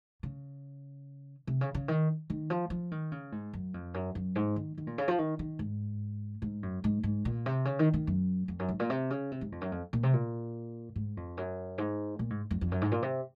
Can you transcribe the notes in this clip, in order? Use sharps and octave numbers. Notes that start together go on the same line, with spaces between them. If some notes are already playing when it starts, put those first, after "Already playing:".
C#3
C3
C#3
C#3
D#3
D#3
F3
F3
D#3
C#3
G#2
F#2
F2
F#2
F#2
G#2
D#3
D#3
A#2
C#3
F3
D#3
D#3
G#2
G#2
F#2
G#2
G#2
A#2
C3
C#3
D#3
D#3
F#2
F2
F#2
G#2
A#2
C3
C#3
C3
G#2
F2
F#2
F2
A#2
C3
A#2
G#2
F2
F#2
G#2
A#2
G#2
F2
F2
F#2
G#2
A#2
C3